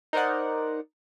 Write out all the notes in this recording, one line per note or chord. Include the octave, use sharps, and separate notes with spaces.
D#4 A#4 C5 D5 F#5